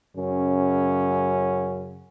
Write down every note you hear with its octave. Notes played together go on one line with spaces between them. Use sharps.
F#2 C#3 C#4